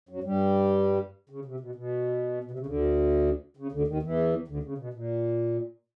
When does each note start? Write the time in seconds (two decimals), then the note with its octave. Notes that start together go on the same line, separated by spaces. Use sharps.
0.09 F#2 F#3
0.24 G2 G3
1.30 C#3
1.45 C3
1.60 B2
1.75 B2
2.44 B2
2.51 C3
2.59 C#3
2.66 D2 D3
3.57 C#3
3.72 D2 D3
3.87 D#2 D#3
4.03 E2 E3
4.48 D2 D3
4.63 C#3
4.78 B2
4.94 A#2